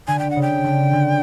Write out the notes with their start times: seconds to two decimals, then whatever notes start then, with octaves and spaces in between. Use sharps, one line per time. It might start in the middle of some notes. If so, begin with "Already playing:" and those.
0.07 D3 G#5
0.19 G5
0.30 F#5
0.36 C#3
0.42 G5
0.64 D3
0.93 D3